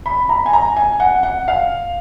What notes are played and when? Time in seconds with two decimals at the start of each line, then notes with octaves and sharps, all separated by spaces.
0.06 B5
0.29 A#5
0.46 G#5
0.53 A#5
0.77 G#5
1.00 F#5
1.23 F#5
1.48 F5